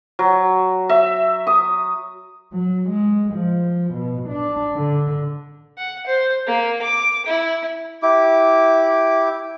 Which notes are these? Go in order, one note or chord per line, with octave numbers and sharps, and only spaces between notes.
F#3
E5
D#6
F#3
G#3
F3
B2
D4
D3
F#5
C5
A#3
D6
E4
E4 G4 D6